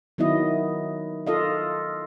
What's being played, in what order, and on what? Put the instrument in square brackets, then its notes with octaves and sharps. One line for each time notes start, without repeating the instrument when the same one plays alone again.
[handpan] D#3 F#3 B3 E4 D#5
F4 A4 D#5 F5